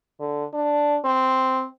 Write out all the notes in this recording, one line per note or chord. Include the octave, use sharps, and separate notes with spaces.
D3
D4
C4